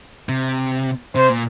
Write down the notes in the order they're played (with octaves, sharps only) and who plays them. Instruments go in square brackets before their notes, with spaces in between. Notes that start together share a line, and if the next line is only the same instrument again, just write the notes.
[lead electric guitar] C3
[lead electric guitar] C3 [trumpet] C5
[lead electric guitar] A#2